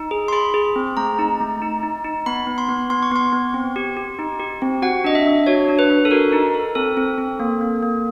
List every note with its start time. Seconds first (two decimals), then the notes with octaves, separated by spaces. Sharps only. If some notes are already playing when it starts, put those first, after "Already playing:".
Already playing: D#4
0.11 G#4
0.28 C6
0.33 G#4 B5
0.54 G#4
0.76 C4
0.97 A3 A#5
1.19 D#4
1.40 A3
1.62 D#4
1.83 D#4
2.04 D#4
2.26 B3 B5
2.47 B3
2.58 C6
2.69 B3
2.90 B3 C6
3.03 C#6
3.12 B3 C6
3.33 B3
3.54 C4
3.76 G4
3.97 G4
4.19 D#4
4.40 G4
4.62 C4
4.82 F#4 F#5
5.04 D4 D#5
5.15 E5
5.26 D4
5.47 F#4 C#5
5.69 D4
5.79 B4
5.90 D4
6.05 A4
6.11 F#4 A#4
6.33 D#4
6.54 A4
6.75 C4 A4
6.97 C4
7.18 C4
7.40 A#3
7.61 A#3
7.83 A#3